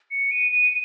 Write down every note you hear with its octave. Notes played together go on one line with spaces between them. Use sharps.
C#7
D#7
D#7